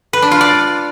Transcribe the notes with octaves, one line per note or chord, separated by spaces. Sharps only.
B4
D4
F4
D5